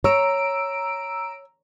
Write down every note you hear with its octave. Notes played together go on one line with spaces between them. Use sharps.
C#5 A#5 E6 D7